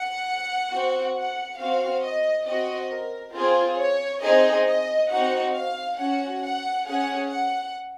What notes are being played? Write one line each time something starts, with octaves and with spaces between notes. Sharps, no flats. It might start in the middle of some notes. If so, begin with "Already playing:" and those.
Already playing: F#5
C4 F#4
F#5
C4 F#4 F5
D#5
C4 F#4 D#5
A#4
C4 F4 G#4 C5
C#5
C4 D#4 G#4 D#5
D#5
C4 D#4 F#4 F#5
F5
C#4 F#4 F#5
F#5
C#4 G#4 F#5
F#5